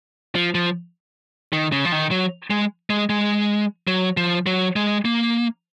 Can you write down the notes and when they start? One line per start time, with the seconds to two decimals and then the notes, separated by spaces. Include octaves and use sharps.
0.35 F3
0.55 F3
1.53 D#3
1.72 C#3
1.85 F3
1.92 D#3
2.11 F#3
2.50 G#3
2.90 G#3
3.09 G#3
3.87 F#3
4.17 F3
4.46 F#3
4.76 G#3
5.05 A#3